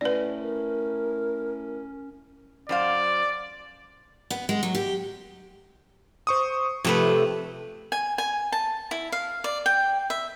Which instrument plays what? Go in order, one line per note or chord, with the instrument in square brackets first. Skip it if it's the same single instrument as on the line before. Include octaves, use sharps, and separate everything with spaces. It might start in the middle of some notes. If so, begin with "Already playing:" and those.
[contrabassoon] A2 [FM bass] C#4 [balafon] B4 D5
[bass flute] A#4
[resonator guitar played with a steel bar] F#2 C5 F5 [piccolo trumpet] D5
[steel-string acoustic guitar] B3
G#3
F#3
G4
[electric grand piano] C5 C#6 D#6
[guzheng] C3 A3 B4 [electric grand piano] F3
[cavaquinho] G#5
G#5
A5
E4
F5
D5
G5
E5